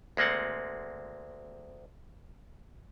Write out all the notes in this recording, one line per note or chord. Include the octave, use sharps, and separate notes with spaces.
D2 G#3 A#3 C4 F#5